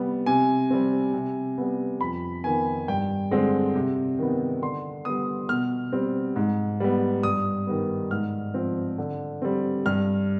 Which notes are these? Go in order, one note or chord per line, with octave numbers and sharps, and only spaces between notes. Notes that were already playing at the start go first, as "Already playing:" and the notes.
Already playing: C3 G3 B3
C3 G#5
G3 C4
C3
G3 B3
F2 B5
D#3 B3 G#5
G2 G5
D3 G#3 C4
C3
D#3 B3
D3 C6
G3 B3 D#6
B2 F6
G3 C4
G#2
G3 B3
G2 D#6
D#3 G3 B3
G#2 F6
F3 C4
D3
G3 C4
G2 F6